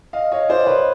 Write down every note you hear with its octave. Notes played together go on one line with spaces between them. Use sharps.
D#5 F5
C#5 D#5
C5 D5
D5
B4 C#5